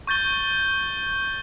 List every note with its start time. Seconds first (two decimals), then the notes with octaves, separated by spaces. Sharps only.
0.07 C#6 G6 A6 G7